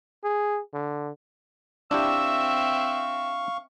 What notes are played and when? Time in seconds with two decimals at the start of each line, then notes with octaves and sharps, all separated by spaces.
0.24 G#4
0.73 D3
1.91 C4 D4 E4 G4 E5 F5 C#6 E6